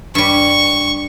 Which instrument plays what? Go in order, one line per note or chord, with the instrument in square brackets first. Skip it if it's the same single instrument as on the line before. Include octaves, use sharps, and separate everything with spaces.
[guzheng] G2 G3 [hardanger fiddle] C#6